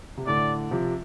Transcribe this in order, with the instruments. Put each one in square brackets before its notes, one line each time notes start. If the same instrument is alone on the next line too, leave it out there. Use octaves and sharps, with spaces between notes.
[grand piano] C3
[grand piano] A2 D3 [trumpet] D5
[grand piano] C3 F3